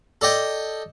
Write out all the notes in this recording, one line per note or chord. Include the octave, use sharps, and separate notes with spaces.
A4 D5 D#5 G5